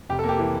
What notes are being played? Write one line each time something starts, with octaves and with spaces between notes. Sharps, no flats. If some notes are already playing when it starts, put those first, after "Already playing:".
F1 G4
A4
A#3
G4
E3